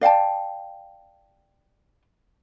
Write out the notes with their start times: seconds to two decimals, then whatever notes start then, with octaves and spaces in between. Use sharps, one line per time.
0.01 D5 F5 G5 A5